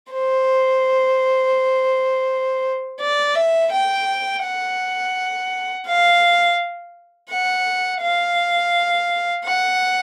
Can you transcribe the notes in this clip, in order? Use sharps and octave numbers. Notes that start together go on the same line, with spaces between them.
C5
D5
E5
G5
F#5
F5
F#5
F5
F#5